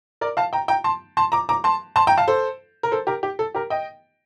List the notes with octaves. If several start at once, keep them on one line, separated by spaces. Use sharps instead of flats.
A#4 D5
F5 A5
G5 A#5
G5 A#5
A5 C6
A5 C6
A#5 D6
A#5 D6
A5 C6
A5 C6
G5 A#5
F5 A5
A4 C5
A#4
A4 C5
G4 A#4
G4
A4
G4 A#4
D#5 G5